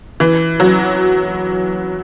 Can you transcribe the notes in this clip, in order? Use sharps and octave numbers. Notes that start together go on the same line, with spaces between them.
E3
F#3